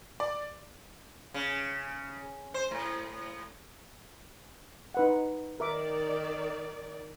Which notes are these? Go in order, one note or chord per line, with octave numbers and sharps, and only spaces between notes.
D5
C#3
C5
A2
D#4 B4 F#5
D#3 A#4 D5 E5 D6